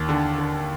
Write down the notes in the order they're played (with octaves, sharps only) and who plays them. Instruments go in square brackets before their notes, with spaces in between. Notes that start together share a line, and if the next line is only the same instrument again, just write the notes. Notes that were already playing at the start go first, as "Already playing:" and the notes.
Already playing: [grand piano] D#2
D3
D3